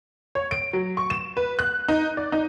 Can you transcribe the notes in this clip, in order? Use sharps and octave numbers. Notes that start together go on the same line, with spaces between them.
C#5
D7
F#3
C#6
E7
B4
F#6
D#4
D5
D#4